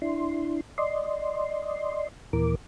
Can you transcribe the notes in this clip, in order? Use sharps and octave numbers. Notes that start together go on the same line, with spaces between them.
D4 E4 C6
D5 D#5 C6
D#2 A#2 E3 A#4 D6